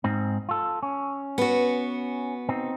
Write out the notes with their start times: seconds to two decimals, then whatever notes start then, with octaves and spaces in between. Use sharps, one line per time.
0.04 G#2 C4 D#4
0.49 F4 A4
0.83 C#4
1.38 B3 F#4
2.49 C4 D#4